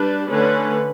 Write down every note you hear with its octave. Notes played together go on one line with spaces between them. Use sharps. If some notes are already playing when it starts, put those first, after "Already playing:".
Already playing: G3 D4 B4
D3 A3 C#4 B4